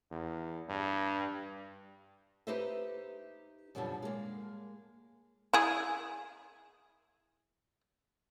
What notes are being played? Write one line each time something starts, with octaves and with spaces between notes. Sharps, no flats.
E2
G2
D#4 G4 B4 C5 D#5 E5
F#2 B2 D3 F3 G3
G#3 A#3
E4 G#4